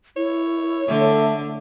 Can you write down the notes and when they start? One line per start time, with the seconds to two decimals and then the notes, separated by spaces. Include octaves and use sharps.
0.17 E4 C#5
0.88 D3 A3 E5